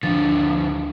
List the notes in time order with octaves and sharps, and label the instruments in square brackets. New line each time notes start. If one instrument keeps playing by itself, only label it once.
[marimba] D2 D4 A6 [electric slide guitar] D3 F3